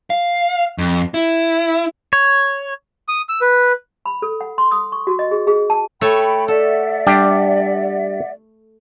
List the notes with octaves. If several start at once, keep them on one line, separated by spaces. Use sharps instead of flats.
F5
F2
E4
C#5
D#6
E6
B4
B5
A4
F#5
C6
D#6
C#6
F#4
D#5
G#4
G#4
A5
A3 A4 C#5 G5 B5
A4 D5 E5 F#5
G3 D4 G4